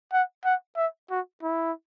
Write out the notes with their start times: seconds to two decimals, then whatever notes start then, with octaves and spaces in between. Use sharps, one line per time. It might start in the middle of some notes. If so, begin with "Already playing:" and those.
0.12 F#5
0.45 F#5
0.76 E5
1.10 F#4
1.43 E4